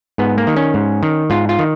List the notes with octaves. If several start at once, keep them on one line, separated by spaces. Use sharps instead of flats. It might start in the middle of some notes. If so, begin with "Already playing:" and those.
G#2 B3
A#3
D#3
C#4
G#2
D#3
G#2 F4
F4
D#3